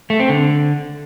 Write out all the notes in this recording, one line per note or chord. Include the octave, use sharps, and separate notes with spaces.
A3
C4
D3